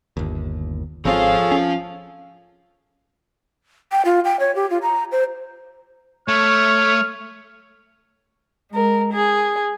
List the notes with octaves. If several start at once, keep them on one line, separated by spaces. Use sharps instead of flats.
G1 D#2
G#1 F3 C4 F4 G#4 A4 C#5 F5
C#4
G5
F4
G5
C#5
G4
F4
A#5
C5
A3 C#5 F6
G#3 A#4
G#4